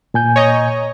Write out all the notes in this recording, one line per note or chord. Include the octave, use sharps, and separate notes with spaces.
A#2 G#5 G6
C#5 D#5 A#5